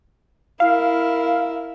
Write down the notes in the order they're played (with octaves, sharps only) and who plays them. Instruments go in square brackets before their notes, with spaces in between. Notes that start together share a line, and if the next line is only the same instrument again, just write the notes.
[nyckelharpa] E4 A#4 [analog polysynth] F5